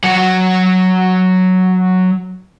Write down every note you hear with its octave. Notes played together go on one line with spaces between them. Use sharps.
F#3 F#5